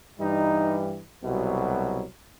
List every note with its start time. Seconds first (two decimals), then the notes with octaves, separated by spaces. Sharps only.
0.19 G2 E3 G3 D#4
1.22 C2 B2 F#3